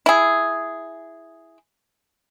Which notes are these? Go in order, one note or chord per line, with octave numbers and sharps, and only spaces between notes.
E4 G#4